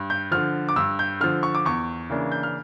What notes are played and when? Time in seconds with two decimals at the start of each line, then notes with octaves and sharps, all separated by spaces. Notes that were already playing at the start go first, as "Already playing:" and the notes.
Already playing: G2
0.10 G6
0.31 D3 F3 F6
0.69 D6
0.76 G2 E6
0.99 G6
1.21 D3 F3 F6
1.43 C#6
1.55 D6
1.65 E2 C#6
2.10 C#3 E3 A#3 D4
2.32 G6
2.43 F6